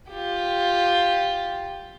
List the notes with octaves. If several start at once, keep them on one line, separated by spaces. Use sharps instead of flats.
F4 G4